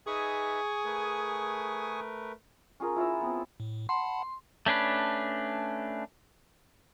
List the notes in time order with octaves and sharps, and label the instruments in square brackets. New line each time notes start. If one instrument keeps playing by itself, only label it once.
[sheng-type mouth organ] D#4 B4 E5 [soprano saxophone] G#4 [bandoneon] G#5 C#6 D#6
[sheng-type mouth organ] A3 A#4 B4
[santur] C#4 F4 G#4 A#4
E4 F4 A#5 E6
B3 C4
[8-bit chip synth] A2
[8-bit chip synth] F#5 A5 B5 [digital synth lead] C6
[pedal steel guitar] A3 C#4 D4 B4